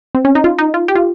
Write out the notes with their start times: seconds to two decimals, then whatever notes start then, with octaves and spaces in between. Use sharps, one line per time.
0.15 C4
0.25 C#4
0.35 D#4
0.44 F4
0.58 D#4
0.74 F4
0.88 G4
0.96 F4